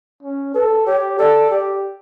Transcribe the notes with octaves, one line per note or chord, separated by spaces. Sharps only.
C#4
A4 B4
G4 C#5
A4 D5
G4